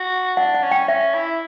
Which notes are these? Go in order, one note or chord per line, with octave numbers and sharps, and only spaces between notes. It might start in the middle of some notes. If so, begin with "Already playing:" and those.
Already playing: F#4
D4 F#5
F#5
C#4
G5
C#4 E5
E4